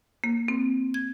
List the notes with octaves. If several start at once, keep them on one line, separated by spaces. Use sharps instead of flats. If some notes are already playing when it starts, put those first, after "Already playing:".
A#3
C4
G#6